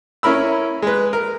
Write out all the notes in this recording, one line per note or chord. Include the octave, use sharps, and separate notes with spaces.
C#4 E4 A#4 B5 E6
G#3 B4
A#4